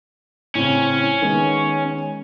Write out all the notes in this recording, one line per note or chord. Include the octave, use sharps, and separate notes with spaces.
A2 C#3 C4 C#4
D#3 G#3 B3